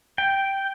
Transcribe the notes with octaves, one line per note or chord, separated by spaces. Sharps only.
G5